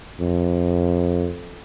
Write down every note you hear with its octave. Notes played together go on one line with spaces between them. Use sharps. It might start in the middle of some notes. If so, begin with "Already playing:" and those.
F2